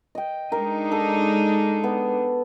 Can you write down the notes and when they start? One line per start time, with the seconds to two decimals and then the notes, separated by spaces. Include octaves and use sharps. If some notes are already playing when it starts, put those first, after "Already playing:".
0.15 D#5 G5
0.52 G#3 D4 D#4 A#4
0.92 A4
1.84 B3